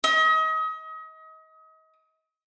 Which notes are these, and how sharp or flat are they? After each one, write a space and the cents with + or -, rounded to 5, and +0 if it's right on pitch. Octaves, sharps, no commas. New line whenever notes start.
D#5 +35